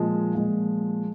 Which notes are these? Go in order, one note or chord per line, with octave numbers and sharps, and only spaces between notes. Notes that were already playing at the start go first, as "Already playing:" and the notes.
Already playing: A#2 F3 G#3
A#2 F3 G#3